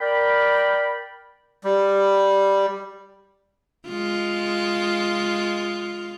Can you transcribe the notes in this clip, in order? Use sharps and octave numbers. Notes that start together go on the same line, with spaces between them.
A#4 D5 G5 B5
G3
G#3 F4